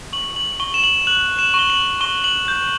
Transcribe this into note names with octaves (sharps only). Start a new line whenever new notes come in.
C#6 F#7
F#7
C#6 G7
E7
F#7
F#6 F#7
E7
C#6
G7
F#7
C#6 G7
F#7
G6